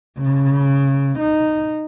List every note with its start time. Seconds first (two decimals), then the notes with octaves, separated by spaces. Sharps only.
0.19 C#3
1.19 D#4